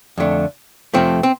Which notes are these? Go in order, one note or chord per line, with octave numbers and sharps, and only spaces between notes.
F2 D3 A3
F2 C3 F3 A3 C4
C4